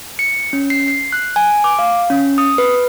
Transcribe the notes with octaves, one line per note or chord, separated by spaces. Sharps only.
C#7
C#4
C7
C7
F#6
G#5
D6
F5
C#4
D#6
B4